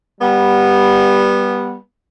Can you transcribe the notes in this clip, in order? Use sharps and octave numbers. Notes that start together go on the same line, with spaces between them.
G3 B3